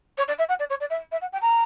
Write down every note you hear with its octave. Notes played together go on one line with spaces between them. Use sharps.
C#5
D5
E5
F#5
D5
C#5
D5
E5
E5
F#5
G5
A#5